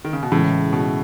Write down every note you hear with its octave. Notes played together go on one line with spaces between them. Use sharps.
D#3
C#3
B2
A2 C#3 E3 G#3
B2